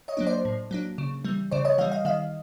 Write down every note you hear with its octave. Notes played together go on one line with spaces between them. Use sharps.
C#5 D#5
F#3 A#3 D4
C5 D5
A2
F#3 A#3 D4
C#3
E3 G3
C#3 C5 D5
C#5 D#5
E3 G3 D#5 F5
D#5 F5
D#3 D#5 F5